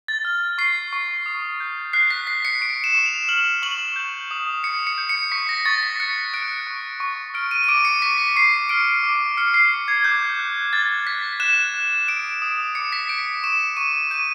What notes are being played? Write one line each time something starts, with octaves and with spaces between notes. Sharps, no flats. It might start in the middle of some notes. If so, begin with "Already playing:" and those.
A6
F6
C#6 C7
C#6
D#6
G6
F#6 C7
B6
F#6 B6
C#7
C#6 D7
E7
C#6
F7
F6 F#7
C#6 F#7
G6
D#6
D#6 C#7
C#7
G6
C#7
C#6 B6
A#6
C#6 A6
B6
F#6 C#7
F#6 D7
C#6
C#6
F6 D7
D#7
D#7
D6 D7
C#7
C#6 B6
C#6 C7
F6 D7
D6
F6 C#7
C7
C#6
G#6
D6 G6
F#6
F#6 A6
F#6 B6
F#6 E7
F#6
D#6 D7
D#6
D6 C#7
B6
G6 D7
C#6 E7
C#6 D#7
G6 D#7